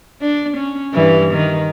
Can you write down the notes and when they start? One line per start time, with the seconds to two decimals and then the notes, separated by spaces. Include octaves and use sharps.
0.21 D4
0.57 C#4
0.94 G2 E3
1.34 D#3